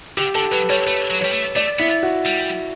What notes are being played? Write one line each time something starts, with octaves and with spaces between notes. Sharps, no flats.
D3 G4
D3 A4
F#3 B4
G3 C#5
A3 B4
F#3
G3 C#5
A3
A3 D5
B3 E4
F#4
G3